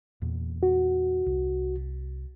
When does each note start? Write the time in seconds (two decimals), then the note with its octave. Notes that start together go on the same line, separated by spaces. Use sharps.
0.22 E2 A#2
0.63 F#4
1.26 C2